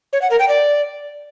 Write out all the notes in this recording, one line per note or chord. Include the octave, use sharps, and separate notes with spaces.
C#5
F#5
A#4
G5
D5